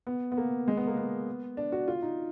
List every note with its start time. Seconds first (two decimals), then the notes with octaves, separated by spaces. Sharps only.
0.07 B3
0.32 B3
0.37 A#3
0.68 G#3
0.77 B3
0.87 A#3
0.97 B3
1.57 D4
1.72 F#4
1.88 F4
2.02 D#4